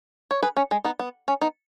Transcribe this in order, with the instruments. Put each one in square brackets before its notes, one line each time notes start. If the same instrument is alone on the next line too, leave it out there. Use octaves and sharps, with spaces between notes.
[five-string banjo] C#5
G#4 B4
C#4
G#3
B3 D#4
B3
C#4
B3 D#4